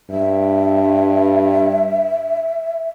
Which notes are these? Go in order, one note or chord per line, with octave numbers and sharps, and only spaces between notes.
G2 E5